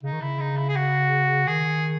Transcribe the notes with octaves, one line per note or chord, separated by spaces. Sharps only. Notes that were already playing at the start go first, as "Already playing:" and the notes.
C#3 D#4
D#3
C#3 E4
D#4
E4
G#4
F#4
D#3 G#4